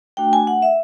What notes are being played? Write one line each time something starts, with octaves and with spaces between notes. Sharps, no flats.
A3 D4 F#4 G5
G#5
F#5
E5